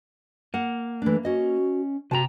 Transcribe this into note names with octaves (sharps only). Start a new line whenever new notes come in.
A#3 F#5
E3 A3 D4
C#4 F#4 D#5
C3 F#4 G5 A5 A#5